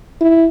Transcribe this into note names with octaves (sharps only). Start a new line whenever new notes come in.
E4